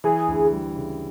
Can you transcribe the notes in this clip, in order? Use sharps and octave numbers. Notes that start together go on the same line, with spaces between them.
E3 G#4
D2
G3
C#3